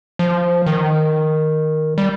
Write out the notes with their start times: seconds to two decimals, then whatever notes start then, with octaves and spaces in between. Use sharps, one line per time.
0.19 F3
0.66 D#3
1.98 G3